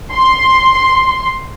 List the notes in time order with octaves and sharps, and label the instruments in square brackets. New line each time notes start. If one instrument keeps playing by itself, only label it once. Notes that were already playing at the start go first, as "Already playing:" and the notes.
[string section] C6